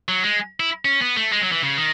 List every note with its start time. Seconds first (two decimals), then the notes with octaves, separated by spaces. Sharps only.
0.08 F#3
0.24 G#3
0.60 E4
0.85 C#4
1.01 B3
1.16 A3
1.32 G#3
1.42 F#3
1.52 E3
1.63 C#3
1.77 D#3